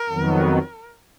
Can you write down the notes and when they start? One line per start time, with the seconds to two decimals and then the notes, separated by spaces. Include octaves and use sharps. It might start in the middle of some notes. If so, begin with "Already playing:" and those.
Already playing: A#4
0.09 F2 D#3 F#3 B3